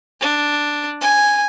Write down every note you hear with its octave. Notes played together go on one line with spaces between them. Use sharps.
D4
G#5